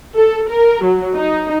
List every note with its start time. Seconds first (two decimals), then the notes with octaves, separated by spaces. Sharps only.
0.17 A4
0.50 A#4
0.84 F#3
1.16 D#4